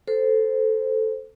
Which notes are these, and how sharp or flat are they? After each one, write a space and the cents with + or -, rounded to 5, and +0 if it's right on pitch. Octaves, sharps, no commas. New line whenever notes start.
A4 +0 C5 -10